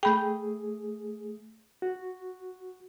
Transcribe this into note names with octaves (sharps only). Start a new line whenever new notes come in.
A3 G#4 G5 B5 G6
F#4